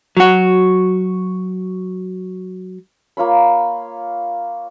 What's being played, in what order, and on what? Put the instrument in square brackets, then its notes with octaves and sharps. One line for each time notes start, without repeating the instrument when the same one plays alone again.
[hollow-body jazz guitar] F#3 F#4
[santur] A#3 F4 C#5 B5